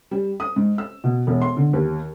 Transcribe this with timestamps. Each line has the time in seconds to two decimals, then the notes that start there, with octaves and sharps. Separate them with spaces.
0.11 G3
0.40 D#6
0.56 G#2
0.78 E6
1.04 B2
1.27 E1
1.42 C6
1.57 D3
1.73 D#2